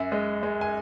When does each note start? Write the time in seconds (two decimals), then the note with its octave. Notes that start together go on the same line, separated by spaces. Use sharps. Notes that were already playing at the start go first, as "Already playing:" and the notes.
Already playing: F#2 E5 G#5
0.12 G#3
0.43 G#3
0.61 G#5